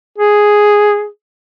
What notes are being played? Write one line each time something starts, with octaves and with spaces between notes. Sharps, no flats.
G#4